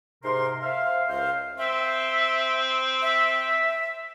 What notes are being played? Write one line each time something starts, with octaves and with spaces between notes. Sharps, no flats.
G#2 C3 A#4 C6
C5 E5 F5
C#2 A#4 C5 F5
C4 E5
E5